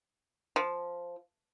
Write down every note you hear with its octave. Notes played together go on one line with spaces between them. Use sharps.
F3